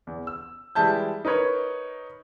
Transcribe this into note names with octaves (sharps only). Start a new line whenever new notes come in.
E2
E6
E3 G3 G#3 E5 A5 G6
D#4 A#4 B4 C#5